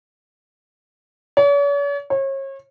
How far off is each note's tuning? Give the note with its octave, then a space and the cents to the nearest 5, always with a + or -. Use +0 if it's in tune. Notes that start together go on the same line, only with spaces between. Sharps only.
C#5 +45
C#5 -35